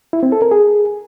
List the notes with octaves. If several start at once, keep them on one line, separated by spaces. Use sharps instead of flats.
E4
C4
A4
A#4
G#4